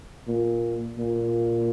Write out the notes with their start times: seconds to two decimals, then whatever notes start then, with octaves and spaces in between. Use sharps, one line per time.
0.28 A#2
0.99 A#2